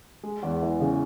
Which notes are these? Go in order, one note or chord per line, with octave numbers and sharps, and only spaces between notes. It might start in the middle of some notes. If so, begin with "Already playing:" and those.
G#3
E2
E3
C#3